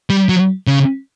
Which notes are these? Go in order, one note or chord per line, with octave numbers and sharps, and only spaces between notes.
G3
F#3
C#3